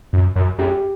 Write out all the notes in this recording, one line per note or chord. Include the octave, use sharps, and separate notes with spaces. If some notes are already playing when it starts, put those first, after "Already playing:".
F#2
F#2
F#2 G4